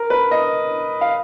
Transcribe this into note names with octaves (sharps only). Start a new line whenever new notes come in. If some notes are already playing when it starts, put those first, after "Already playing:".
Already playing: A#4
B4
D#5
F5